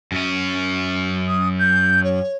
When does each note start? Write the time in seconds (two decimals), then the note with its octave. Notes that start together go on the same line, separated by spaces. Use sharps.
0.12 F#2 C#4
1.28 D#6
1.59 G6
2.04 C#5